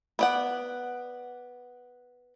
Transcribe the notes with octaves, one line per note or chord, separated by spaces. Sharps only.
B3 D5 F#5